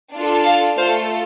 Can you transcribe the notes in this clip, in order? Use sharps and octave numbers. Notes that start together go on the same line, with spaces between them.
D4 F4 A4
F5 A5
A3 F4 A4 C5 F5